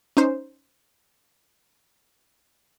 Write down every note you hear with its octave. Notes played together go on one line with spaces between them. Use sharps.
C#4 D#4 C5